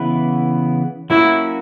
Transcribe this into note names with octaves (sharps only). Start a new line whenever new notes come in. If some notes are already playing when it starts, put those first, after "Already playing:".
Already playing: C#3 E3 B3 E4 B4
F#3 A#3 C#4 E4 F#4